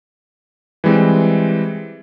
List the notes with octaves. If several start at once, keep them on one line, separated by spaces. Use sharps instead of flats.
E3 G3 G#3 C4